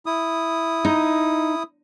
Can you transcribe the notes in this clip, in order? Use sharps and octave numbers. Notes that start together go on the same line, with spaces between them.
E4 D#6
D#4